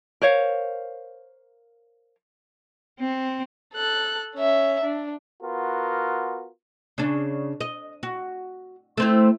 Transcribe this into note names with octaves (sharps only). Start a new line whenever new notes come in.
A#4 C5 C#5 F5
C4
A4 F#6
C#4 E5
D4
B3 F4 F#4 A#4
C#3 D4
D#5
F#4
A3 C4 E4